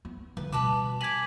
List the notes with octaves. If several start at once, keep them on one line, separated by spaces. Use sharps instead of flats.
B3
D2 B4
B2 G3 B4 A5 B5 D6
G#5 D6 G#6 B6 F#7